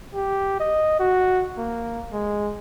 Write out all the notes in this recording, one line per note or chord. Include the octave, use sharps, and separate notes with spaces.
G4
D#5
F#4
A#3
G#3